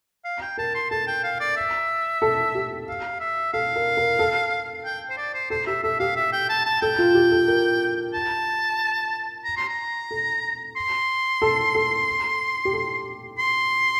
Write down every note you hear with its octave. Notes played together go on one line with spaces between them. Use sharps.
F5
G5
A#4 A5
C6
A4 A5
G5
F5
D5
E5
A4
G4
F5
E5
A4 F5
A#4
A#4
A4
G5
C5
D5
C5
A4 C5
G4 E5
A4 E5
G4 F5
E5
G5
A5
A5
A4 G5
F4
G4
A4
A#4
A5
A#5
C6
A#5
A4
C6
A4
A4
G4
A4
C6